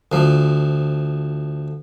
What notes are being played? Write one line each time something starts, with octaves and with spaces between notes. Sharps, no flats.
D2 F3